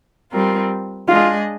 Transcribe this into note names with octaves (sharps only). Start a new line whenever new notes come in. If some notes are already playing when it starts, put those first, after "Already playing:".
G3 C4 F4 A#4
G#3 D4 F4 G#4 D#5